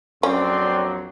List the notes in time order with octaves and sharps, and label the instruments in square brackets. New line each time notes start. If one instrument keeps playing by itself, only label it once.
[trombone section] A#1 F2 F#3 [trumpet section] C4 D5 C6 [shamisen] C#4